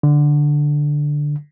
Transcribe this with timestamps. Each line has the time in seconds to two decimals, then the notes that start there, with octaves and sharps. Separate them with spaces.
0.03 D3